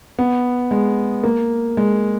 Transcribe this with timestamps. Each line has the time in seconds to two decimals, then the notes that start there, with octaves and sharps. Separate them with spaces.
0.19 B3
0.71 G#3
1.24 A#3
1.77 G#3